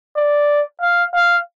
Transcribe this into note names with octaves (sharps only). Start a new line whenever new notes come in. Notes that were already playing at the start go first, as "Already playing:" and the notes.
D5
F5
F5